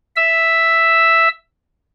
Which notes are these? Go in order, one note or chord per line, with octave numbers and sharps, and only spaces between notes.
E5 E6